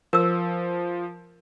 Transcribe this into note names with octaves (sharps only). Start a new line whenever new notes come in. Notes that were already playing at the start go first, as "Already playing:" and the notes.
F3 A#4 E6